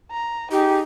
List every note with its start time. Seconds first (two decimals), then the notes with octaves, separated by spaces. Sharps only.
0.11 A#5
0.51 D#4 G4 G#4